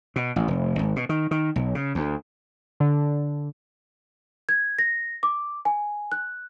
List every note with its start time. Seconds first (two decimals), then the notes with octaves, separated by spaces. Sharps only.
0.16 B2
0.36 A1
0.48 F1
0.79 G#1
0.96 B2
1.09 D#3
1.31 D#3
1.56 B1
1.75 C#3
1.95 D2
2.80 D3
4.49 G#6
4.79 A#6
5.23 D6
5.65 G#5
6.12 F#6